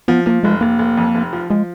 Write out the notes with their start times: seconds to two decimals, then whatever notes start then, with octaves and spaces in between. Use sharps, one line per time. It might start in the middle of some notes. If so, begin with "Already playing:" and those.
0.08 F3 B3
0.26 F3 A#3
0.43 F1 G#3
0.61 F1 A#3
0.79 F1
0.97 F2
1.14 F1
1.33 F3
1.50 F3 G#3